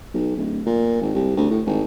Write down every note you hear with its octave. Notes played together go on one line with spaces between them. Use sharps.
B1
D1
A#2
G#1
C2
D2
A2
G#1